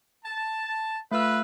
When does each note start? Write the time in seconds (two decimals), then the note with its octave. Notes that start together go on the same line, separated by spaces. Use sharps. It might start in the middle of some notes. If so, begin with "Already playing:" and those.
0.25 A5
1.11 A3 F4 B4 E6